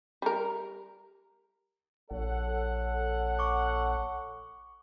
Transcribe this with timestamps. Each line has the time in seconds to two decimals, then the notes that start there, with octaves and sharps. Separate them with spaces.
0.22 G3 A#4
2.11 A#1 A4 C#5 F#5
3.39 C#6 D6